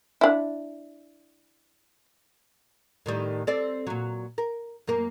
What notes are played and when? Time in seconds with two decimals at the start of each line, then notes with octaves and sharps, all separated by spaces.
0.21 D4 E4
3.06 A2 D#3 G3
3.47 C4 A4 D5
3.87 A#2 F#3
4.38 A#4
4.87 F#2 A#3 A#4